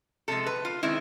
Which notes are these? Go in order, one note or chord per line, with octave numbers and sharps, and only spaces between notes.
C3 F3 G#3 A4
B4
F4
D#3 G#3 C4 E4